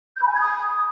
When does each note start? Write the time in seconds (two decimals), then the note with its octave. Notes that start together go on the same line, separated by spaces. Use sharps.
0.16 G6
0.22 B5
0.28 G#5
0.34 G#6
0.40 D#6